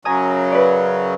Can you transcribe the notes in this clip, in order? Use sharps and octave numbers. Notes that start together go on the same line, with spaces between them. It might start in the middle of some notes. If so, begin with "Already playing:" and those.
F#2 C#3 F#3 G#5 A#5 D#6
B4 D5